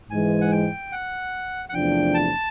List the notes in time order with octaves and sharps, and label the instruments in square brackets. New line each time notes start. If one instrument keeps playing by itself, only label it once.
[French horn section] G#2 E3 G#3 [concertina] G#5
[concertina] F#5
G5
F#5
F#5
[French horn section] E2 C3 F3 A3 D4 [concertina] G5
[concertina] A5